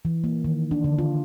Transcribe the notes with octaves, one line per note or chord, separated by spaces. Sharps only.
E3
A#3
D#3
D4
D3
F4